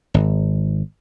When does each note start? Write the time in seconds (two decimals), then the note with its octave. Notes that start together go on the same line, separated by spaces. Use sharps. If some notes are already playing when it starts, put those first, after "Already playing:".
0.14 G#1